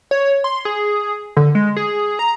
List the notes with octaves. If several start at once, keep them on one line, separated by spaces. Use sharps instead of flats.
C#5
C6
G#4
D3
G#3
G#4
A#5